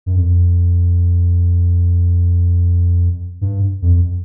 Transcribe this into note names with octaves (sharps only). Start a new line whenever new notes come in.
F#2
F2
G2
F2